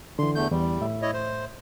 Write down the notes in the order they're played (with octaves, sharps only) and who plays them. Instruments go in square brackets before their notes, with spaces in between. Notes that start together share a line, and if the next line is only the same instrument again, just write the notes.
[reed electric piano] D3 E3 [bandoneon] C6
[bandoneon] E2 A3 G6
[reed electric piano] E2 [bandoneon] G3
[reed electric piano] A2 E5
[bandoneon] E4 C#5 D#5
C5